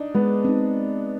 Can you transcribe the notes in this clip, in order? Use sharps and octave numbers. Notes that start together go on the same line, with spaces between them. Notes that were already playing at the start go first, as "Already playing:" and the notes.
Already playing: D4 D#4
G#3 B3
C4 D#4